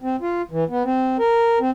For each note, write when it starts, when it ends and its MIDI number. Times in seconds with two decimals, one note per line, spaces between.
0.02 0.16 60
0.21 0.42 65
0.51 0.64 52
0.69 0.83 59
0.84 1.17 60
1.19 1.59 70
1.60 1.71 60